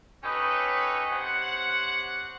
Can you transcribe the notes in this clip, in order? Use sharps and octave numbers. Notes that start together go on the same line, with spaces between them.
C#4 D#4 G4 A4 B4 C#5
C3 C5 C#5 F#5